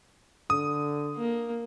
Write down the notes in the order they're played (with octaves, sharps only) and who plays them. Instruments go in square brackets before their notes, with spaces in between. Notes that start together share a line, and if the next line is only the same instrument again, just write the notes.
[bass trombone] D3 [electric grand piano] D#6
[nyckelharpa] A#3